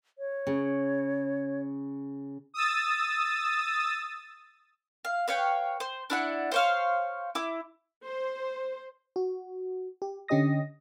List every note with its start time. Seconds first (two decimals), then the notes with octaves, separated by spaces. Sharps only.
0.18 C#5
0.47 C#3
2.54 D#6 E6 A6
5.05 F5
5.28 B4 C#5 F5 G5
5.80 C5
6.10 D4 E4 F#5
6.51 C5 C#5 F5
7.35 E4 D6
8.04 C5
9.16 F#4
10.02 G4
10.28 D3 C#4 G4 D#5 D#6 A#6